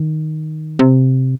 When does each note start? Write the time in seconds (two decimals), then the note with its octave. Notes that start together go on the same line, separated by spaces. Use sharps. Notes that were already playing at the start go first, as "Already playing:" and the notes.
Already playing: D#3
0.79 C3